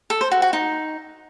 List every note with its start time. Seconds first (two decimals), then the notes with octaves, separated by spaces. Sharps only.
0.10 A4
0.21 C5
0.32 F#4
0.42 F#4
0.53 D#4